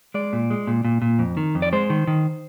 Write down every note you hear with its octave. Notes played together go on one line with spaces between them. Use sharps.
G#3 D5
A#2
G#3
A#2
A#2
A#2
F2
D#3
F2
D5
G#3 C5
D#3
D#3